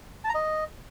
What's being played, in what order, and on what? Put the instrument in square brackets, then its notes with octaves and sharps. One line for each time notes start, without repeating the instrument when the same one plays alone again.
[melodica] A5
A#5
D#5